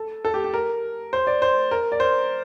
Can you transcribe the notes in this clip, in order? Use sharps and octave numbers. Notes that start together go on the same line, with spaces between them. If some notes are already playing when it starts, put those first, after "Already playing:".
Already playing: A4
A4
G4
G4
A#4
C5
D5
C5
A#4
D5
C5